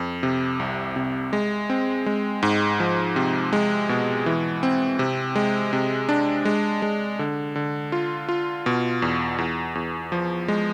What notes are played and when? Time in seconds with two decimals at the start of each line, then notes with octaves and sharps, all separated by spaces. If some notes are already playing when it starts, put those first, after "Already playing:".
Already playing: F2
0.23 C3
0.60 C2
0.96 C3
1.33 G#3
1.70 C4
2.06 G#3
2.43 G#2
2.80 F3
3.16 C3
3.53 G#3
3.89 B2
4.26 E3
4.63 C4
4.99 C3
5.36 G#3
5.73 C3
6.09 D4
6.45 G#3
6.82 G#3
7.19 D3
7.56 D3
7.92 F4
8.29 F4
8.66 B2
9.02 E2
9.38 E2
9.75 E2
10.12 F3
10.48 G#3